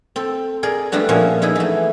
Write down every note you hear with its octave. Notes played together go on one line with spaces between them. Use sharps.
C4 A4
G#4 A#4 D5
G3 A3 B3 D4 F#4
A#2 F3 C#4
B3 D#4 E4 G#4
E3 A3